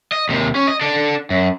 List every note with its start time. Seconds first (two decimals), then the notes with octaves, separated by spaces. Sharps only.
0.12 D#5
0.29 D#2 C3
0.55 C#4
0.67 D#5
0.81 D4 A4
1.30 F#2